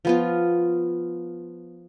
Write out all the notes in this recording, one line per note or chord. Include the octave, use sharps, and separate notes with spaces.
F3 B3 F4